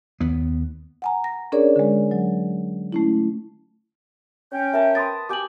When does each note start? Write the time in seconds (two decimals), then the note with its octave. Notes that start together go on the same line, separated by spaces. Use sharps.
0.20 D#2 B3
1.02 F#5 G#5 A#5
1.24 A#6
1.52 C#4 D4 G#4 A#4 C#5 D5
1.76 D3 G#3
2.11 F#3
2.93 A3 C#4 E4
4.52 C#4 G5
4.73 A#4 E5 A5
4.95 B4 C6 D#6 A6
5.29 G4 G5 G#5 D6 F#7